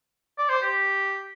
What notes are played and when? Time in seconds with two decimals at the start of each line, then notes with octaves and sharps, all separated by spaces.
0.38 D5
0.49 C5
0.62 G4